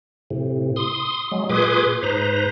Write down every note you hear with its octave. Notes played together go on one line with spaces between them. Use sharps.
A2 C3
C6 D#6
F#3 G#3
A#2 G#4 B4 C6 D6 D#6
G#2 B4 C5 A#5